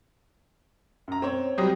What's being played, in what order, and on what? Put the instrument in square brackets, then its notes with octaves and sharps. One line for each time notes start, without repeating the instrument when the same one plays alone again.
[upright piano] F#2 A#5
C4 C#5
[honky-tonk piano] F#3 G3 C4 [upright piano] D#6